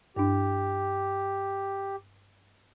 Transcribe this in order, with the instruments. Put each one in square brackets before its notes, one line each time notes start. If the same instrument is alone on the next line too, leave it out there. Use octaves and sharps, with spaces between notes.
[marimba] G2 D4 [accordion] G4